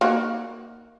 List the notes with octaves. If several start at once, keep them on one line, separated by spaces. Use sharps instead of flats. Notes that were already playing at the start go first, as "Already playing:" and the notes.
A#3 D#4 F#4